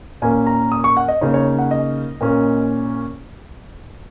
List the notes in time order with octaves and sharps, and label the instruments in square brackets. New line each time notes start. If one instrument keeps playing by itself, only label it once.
[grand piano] A#2 A#3 C#4 G#5
A#5
D#6
C#6
F#5
D#5
C#3 A#3 D#4 C#5
C#5
F#5
D#5
A#2 A#3 C#4